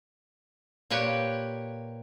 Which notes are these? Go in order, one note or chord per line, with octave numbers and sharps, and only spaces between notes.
A#2 G4 B4 C#5